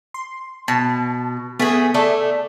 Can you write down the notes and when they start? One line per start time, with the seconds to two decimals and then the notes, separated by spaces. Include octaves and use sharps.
0.14 C6
0.68 B2 A5
1.60 A3 B3 G#4 G#5 B6
1.94 A3 A4 D5 E5